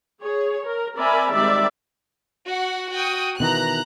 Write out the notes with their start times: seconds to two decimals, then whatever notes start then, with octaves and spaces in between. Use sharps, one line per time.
0.23 G#4 C#5
0.67 A#4
0.96 C4 A#4 D5 E5 G#5 B5
1.31 D#3 G3 G#3 C4 D5 E5
2.48 F#4 F#5
2.93 F#4 G5 D#6
3.40 B2 D#3 E3 A#5 F#6